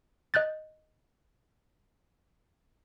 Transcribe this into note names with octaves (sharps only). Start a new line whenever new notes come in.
D#5 F#6 G6 A6